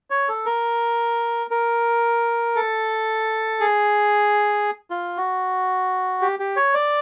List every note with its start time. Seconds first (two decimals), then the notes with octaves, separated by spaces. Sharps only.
0.10 C#5
0.29 A4
0.46 A#4
1.51 A#4
2.56 A4
3.60 G#4
4.90 F4
5.17 F#4
6.21 G4
6.39 G4
6.56 C#5
6.74 D5